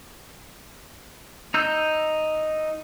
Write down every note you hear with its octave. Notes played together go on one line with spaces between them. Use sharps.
D#4 E6 G6